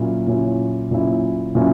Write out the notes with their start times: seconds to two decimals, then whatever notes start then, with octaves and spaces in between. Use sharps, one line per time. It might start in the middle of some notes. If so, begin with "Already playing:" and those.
Already playing: A#2 F#3 C#4 E4
0.27 A#2 F#3 C#4 E4
0.91 A#2 F#3 C#4 E4
1.55 A#2 F#3 C#4 E4